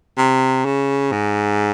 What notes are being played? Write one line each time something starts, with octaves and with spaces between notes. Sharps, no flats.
C3
C#3
G#2